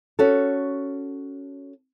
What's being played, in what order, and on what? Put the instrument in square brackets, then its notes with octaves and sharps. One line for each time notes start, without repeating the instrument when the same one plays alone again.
[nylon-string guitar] C#4 F#4 A4